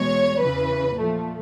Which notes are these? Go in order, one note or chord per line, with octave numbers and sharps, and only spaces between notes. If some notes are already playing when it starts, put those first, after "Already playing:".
Already playing: E2 B2 G#3 C#5
E2 C#3 E3 B4
A#2 F3 A3